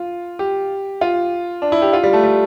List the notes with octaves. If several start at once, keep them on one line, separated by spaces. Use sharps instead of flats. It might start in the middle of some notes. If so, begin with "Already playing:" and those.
Already playing: F4
G4
F4
D4
E4
G4
F4
G3
A3
G3